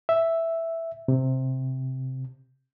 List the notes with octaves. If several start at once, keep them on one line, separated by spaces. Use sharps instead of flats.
E5
C3